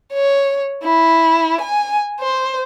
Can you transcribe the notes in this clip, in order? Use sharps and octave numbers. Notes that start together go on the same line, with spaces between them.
C#5
E4
G#5
C5